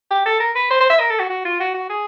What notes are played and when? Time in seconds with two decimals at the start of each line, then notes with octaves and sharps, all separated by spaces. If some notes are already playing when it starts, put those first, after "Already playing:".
0.11 G4
0.26 A4
0.40 A#4
0.55 B4
0.70 C5
0.80 C5
0.90 E5
1.00 A#4
1.10 A4
1.20 F#4
1.30 F#4
1.45 F4
1.60 F#4
1.74 F#4
1.89 G#4